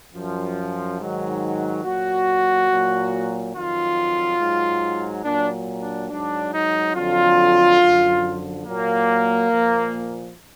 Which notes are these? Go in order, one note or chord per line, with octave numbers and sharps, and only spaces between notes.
F#2 F3
G#2 D#3 F#3
A#2 F#3 F#4
A#2 F#3
F2 D#3 F#3 F4
G#2 F#3
A#2 F#3 D4
D4
G#2 F#3 D4
D#4
F2 D3 F#3 F4
F#2 D3 F3
A#2 F#3 A#3
A#2 F3